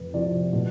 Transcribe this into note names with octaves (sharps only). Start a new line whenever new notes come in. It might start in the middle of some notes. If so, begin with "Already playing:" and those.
Already playing: F2 C3 B4
C3 F3 C4 D5
B2